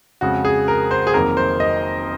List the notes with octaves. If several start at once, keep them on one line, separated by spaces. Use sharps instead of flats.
F2 C#3 G#3 F#4
G#4
A#4
C5
G#4
F1 F2 D#3 F#3 A#3 A#4
C5
D#5